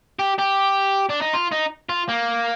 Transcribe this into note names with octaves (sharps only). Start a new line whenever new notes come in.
G4
G4
D4
D#4
F4
D#4
F4
A#3